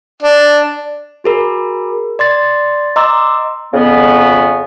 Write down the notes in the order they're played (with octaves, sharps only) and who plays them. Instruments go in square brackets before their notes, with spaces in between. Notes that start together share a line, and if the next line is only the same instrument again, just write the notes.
[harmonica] D4
[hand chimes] F#4 G#4 A#4 B5
D5 C6 A6
D#5 A#5 C6 D6 E6
[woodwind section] F2 C#3 B3